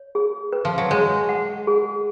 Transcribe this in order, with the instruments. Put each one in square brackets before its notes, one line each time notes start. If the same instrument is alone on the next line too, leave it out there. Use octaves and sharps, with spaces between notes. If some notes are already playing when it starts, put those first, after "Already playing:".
Already playing: [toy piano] C#5
G#4
B4
[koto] F3
F#3
[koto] G#3 [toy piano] C#5
[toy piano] F#5
G#4